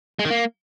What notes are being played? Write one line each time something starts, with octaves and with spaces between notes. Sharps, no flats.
G#3
D#3
A#3